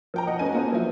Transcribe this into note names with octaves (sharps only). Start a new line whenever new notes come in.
F3 G5 A#5
F#4 D#5 F#5
A3 C#4 B4 G5 G#5 D#7
A#3 B3 F4 F#4 A4 C5
F3 F#3 E4